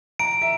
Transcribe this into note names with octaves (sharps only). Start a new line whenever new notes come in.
A#5 D7
E5